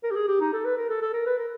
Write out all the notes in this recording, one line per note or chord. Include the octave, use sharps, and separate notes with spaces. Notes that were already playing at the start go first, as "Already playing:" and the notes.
A#4
G4
G#4
G4
D#4
A4
B4
A#4
A4
A4
A#4
B4
A#4